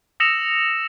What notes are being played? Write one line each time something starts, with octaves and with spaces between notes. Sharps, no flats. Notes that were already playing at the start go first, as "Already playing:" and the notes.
D#6 E6 A#6 C#7 E7 F7